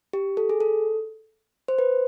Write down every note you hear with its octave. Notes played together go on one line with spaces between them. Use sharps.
G4
A4
G#4
A4
C5
B4